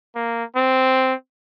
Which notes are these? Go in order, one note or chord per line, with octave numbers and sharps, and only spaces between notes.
A#3
C4